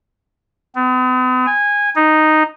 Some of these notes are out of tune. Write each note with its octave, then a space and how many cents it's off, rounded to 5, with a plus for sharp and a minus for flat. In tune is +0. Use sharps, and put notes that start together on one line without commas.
B3 +45
G#5 -15
D#4 -5